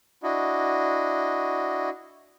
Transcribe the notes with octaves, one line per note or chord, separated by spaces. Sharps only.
D4 E4 F#4 D#5